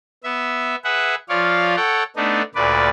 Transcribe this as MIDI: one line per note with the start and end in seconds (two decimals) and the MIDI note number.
0.24 0.75 59
0.24 0.75 76
0.84 1.15 68
0.84 1.15 71
0.84 1.15 76
0.84 1.15 78
1.29 1.75 53
1.29 1.75 65
1.29 1.75 73
1.29 1.75 74
1.29 1.75 77
1.76 2.03 69
1.76 2.03 73
1.76 2.03 78
1.76 2.03 79
2.16 2.42 57
2.16 2.42 59
2.16 2.42 62
2.16 2.42 63
2.55 2.89 38
2.55 2.89 46
2.55 2.89 71
2.55 2.89 74